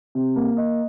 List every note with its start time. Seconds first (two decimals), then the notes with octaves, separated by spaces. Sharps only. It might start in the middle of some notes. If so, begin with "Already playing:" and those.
0.15 C3
0.36 A#3
0.57 D#5